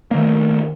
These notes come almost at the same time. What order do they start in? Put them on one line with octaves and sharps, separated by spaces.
A#3 D#3 A3